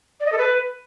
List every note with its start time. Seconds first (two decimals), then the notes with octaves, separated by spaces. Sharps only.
0.20 D5
0.26 D#5
0.32 A4
0.38 B4